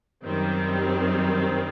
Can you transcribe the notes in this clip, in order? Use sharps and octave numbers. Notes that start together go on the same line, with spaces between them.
F#2 D#3 G3 C4